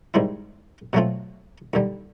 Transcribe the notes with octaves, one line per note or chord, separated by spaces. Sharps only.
G#2 D#3 G3 C4 E4
B2 F#3 A3 C4 F4
D#2 D3 G3